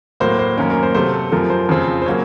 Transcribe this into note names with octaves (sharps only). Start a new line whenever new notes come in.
A2 F#3 A#3 C5
C5
F#2 D#3 A#3 C#4 A#4
A#4
C5
C3 F#3 A3 C5
A4
F#2 F3 A3 A#4
C5
F2 C#3 F3 C4
C5
C#3 F#3 A#3 C#5